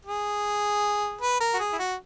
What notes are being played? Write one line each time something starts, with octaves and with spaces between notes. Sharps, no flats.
G#4
B4
A#4
F#4
G#4
E4
F#4